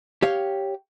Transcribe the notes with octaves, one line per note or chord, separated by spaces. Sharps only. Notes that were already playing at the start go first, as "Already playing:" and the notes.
G4 C#5 F5